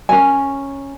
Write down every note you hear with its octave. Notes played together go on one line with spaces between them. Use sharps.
C#4 A#4 G#5